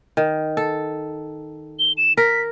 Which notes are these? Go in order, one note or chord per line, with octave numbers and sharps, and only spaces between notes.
D#3
A4
G7
E7
A#4 B6